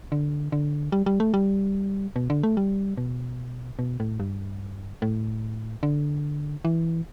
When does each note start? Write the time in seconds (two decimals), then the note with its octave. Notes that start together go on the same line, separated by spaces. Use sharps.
0.12 D3
0.52 D3
0.92 G3
1.06 G3
1.20 A3
1.34 G3
2.16 B2
2.30 D3
2.43 A3
2.57 G3
2.98 B2
3.79 B2
4.00 A2
4.20 G2
5.02 A2
5.83 D3
6.65 E3